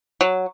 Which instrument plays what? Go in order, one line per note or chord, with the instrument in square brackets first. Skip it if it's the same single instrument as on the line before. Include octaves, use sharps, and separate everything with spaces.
[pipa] F#3